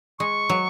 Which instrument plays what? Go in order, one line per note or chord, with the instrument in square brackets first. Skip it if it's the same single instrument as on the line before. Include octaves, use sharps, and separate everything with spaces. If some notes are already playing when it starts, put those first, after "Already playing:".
[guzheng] G#3 [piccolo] C#6
[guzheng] F#3